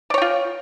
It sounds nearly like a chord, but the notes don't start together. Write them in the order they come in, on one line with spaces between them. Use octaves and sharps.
D5 C#5 G5 F4